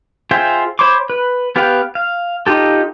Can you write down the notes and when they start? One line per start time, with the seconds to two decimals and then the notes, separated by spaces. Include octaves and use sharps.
0.31 F4 G#4 C5 E5 G5
0.79 C5 C#5 B5 C6 D6
1.10 B4
1.56 B3 G4 B4 F5 G5
1.95 F5
2.47 D#4 F4 G4 A4